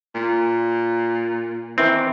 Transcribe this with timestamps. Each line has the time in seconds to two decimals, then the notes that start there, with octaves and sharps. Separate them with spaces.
0.15 A#2
1.78 D#3 E3 C4